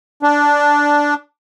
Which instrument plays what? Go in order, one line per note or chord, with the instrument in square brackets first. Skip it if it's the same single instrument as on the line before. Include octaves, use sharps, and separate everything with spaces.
[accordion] D4